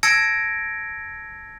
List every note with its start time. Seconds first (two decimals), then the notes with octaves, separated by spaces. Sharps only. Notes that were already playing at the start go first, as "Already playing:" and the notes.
0.03 A5 E6 G#6 A#6 C#7 D7